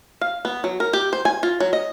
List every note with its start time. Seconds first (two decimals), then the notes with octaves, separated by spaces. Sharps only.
0.21 F5
0.45 B3
0.64 F#3
0.80 A#4
0.93 G4
1.13 C5
1.25 G#5
1.43 F4
1.60 F#3
1.73 D#5